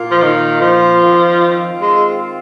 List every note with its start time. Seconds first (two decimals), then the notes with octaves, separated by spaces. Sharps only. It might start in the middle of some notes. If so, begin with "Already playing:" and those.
Already playing: A#2 A#3 F4
0.11 F3
0.22 D#3
0.61 F3
1.01 D#3 C4 F4
1.81 G#3